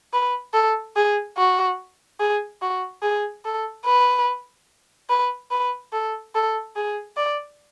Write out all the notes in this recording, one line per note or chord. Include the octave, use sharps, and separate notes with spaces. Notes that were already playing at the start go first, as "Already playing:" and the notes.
B4
A4
G#4
F#4
G#4
F#4
G#4
A4
B4
B4
B4
A4
A4
G#4
D5